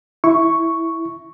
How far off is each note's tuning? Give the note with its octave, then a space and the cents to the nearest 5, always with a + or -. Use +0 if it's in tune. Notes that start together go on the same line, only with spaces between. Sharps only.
E4 +0 C#6 +0